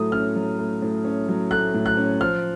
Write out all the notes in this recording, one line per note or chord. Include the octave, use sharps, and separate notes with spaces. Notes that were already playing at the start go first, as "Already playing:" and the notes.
Already playing: A2 F#3 A3 D#6
C#4 F6
F#3
A3
A2
C#4
F#3
A3 F#6
A2
F#6
C#4
F3 F6